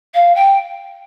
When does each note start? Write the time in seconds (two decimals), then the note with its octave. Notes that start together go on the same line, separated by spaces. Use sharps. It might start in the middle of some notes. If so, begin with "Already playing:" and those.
0.14 F5
0.35 G5